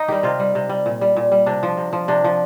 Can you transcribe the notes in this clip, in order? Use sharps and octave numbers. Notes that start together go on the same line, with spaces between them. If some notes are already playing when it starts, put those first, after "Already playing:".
Already playing: D#4
D#3 G3 G4
C3 F4
G3
C3
G3
A#2
G3
A#2
G3
C3 D4
F3
C3
F3
C3 D4
F3